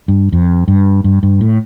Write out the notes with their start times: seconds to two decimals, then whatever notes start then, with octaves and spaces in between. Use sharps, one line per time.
0.08 G2
0.32 F2
0.68 G2
1.04 G2
1.23 G2
1.41 A2